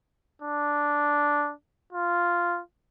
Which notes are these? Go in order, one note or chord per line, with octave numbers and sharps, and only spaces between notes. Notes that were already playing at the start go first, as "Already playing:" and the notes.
D4
F4